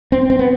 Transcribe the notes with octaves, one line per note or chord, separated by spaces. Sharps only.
C4
C4
B3